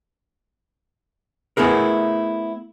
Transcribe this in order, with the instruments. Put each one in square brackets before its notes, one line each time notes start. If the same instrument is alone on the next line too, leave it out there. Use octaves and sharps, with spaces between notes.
[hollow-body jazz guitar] A3 B3 E4 G#4 A#4